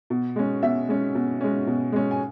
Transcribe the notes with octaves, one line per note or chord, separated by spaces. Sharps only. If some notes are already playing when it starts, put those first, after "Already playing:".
B2
G#3 C#4
B2 E5
G#3 C#4
B2
G#3 C#4
B2
G#3 C#4
G#5